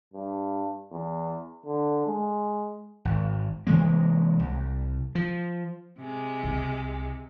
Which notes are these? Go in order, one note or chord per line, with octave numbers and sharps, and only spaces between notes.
G2
E2
D3
G#3
G#1
C3 E3 G#3 A#3
C2
F3
C3 G#3
C2